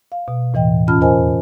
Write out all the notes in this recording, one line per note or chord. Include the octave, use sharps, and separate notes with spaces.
F5
B2
D#2 A2 E3 D#5 G5
E2 C#4 F4 A5 B5 F6
F4 A#4 C5 D#5 G#5